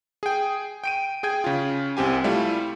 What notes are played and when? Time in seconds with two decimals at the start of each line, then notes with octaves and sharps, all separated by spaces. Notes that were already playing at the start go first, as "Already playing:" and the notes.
0.23 G#4 G5
0.84 G5 D7 D#7
1.23 G#4 G5 G#6
1.44 C#3 F4
1.97 C2 C4 G4 G#5
2.24 G3 A3 E4 F4